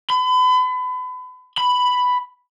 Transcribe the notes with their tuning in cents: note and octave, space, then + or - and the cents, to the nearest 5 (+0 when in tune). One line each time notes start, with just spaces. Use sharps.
B5 +35
B5 +5